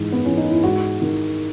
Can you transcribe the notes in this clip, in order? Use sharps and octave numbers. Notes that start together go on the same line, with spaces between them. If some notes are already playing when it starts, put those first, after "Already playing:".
Already playing: G#2 E3
B3
E3 C#4
D#4
E4
G#2 F#4
D#3